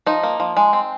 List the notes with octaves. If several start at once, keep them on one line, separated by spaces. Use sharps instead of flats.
F3 D#4
A#3
F3
G#3
C4